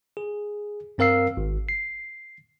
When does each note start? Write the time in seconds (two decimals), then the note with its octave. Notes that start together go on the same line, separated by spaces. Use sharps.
0.17 G#4
0.98 G2 C4 A#4 F5 E6 C7
1.37 G#1
1.69 C7